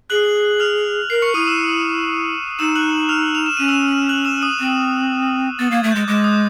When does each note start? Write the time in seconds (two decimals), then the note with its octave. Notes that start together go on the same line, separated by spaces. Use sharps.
0.10 G#4 F#6 F#7
0.60 F6 F7
1.10 A#4 C7
1.22 C#6 C#7
1.34 E4 D#6 D#7
1.47 E6 E7
2.59 D#4 E6 E7
2.76 F#6 F#7
3.09 F6 F7
3.35 F7
3.46 E7
3.57 C#4 D#7
3.68 E6 E7
4.09 F#6 F#7
4.25 E6 E7
4.42 D#6 D#7
4.59 C4
5.58 B3 A6
5.71 A#3 G#6
5.83 A3
5.92 G#3 G6
6.08 G#3 D6
6.24 D#6